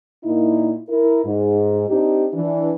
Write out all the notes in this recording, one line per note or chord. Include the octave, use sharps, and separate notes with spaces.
A#2 A#3 D#4 E4
E4 A#4
G#2
C4 D4 D#4 G4
E3 D4